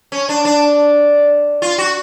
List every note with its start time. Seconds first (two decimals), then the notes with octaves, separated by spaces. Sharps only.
0.12 C#4
0.29 D4
0.45 D4
1.62 F4
1.78 F#4